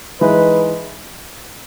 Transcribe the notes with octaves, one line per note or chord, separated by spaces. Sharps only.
E3 G#3 D#4 B4